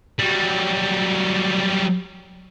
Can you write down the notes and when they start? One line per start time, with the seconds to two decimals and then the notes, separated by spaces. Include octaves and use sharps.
0.19 F#3 G3